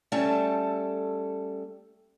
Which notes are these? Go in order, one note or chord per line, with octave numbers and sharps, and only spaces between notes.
G3 A3 C#4 A4 A5